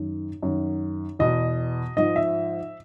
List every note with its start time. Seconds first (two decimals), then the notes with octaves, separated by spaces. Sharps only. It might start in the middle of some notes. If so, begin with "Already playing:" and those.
Already playing: F#2 D#3
0.43 F#2 D#3
1.19 E2 B2 D#5
1.96 G#2 F3 D#5
2.16 E5